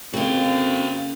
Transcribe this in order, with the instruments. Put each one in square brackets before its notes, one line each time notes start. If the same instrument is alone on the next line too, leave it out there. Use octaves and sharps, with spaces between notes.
[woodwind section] F2 C4 [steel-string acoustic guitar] C#3 A#3 [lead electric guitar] F#4 F5